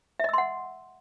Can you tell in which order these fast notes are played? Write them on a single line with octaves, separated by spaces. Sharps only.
E5 D#5 E6 C6 F#5